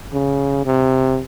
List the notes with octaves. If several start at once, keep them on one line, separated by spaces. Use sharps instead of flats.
C#3
C3